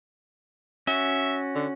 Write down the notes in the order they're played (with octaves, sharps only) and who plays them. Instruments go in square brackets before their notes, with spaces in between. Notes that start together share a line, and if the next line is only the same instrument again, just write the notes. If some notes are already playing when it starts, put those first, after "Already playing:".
[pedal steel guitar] C#4 F#4 [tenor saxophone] E5
[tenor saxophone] D3